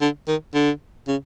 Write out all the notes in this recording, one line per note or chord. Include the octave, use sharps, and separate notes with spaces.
D3
D#3
D3
C#3